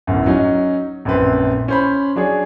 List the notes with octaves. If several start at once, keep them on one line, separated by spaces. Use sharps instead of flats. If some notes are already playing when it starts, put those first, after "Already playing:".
D1 G1 F#2
F#3 C#4 D#4
A#1 F#2 C4 B4 C6
C#4 C5 B5
F#3 D4 G#4 C#5